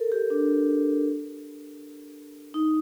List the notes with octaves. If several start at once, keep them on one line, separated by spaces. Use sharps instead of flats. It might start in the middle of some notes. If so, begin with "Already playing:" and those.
Already playing: A4 A#4
G4
D4
D#4